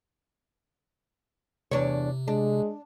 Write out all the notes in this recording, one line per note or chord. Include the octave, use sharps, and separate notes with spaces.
E2 C3 D4 C#5
G#3 D4